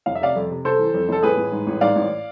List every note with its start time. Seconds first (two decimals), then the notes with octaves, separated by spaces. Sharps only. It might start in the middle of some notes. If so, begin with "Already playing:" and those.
0.06 F1 F5
0.15 E5
0.21 C3 D5 F5
0.36 F2
0.50 C3
0.65 C3 A4 C5
0.79 E3
0.94 F2
1.09 F1 A4
1.23 A1 G#4 B4
1.37 A1
1.52 G#2
1.67 A1
1.81 G#2 D5 F5
1.96 A1